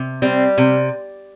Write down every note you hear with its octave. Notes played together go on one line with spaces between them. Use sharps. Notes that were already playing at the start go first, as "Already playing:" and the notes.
Already playing: C3
G3 C4
C3